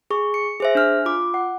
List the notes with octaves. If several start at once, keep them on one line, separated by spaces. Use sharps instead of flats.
G#4 C#6
C#7
G#4 C5 E5
D4 F6
F4 D6
F#5